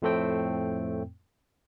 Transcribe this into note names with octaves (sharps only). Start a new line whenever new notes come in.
F2 A2 A3 C4 G5